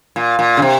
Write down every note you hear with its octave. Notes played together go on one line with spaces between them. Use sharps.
A#2
A#2
C#3
C3